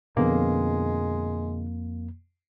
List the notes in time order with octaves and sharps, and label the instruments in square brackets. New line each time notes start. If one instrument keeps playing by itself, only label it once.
[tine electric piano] F2 A#3 [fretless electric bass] B2 D3 B3 [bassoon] G#3